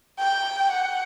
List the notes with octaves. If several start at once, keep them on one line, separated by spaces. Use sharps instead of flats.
G5
F#5